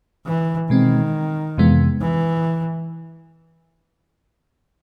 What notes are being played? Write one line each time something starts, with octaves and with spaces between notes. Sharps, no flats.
E3
B2 D#3 G#3 C4
F2 C3 E3 G#3 B3
E3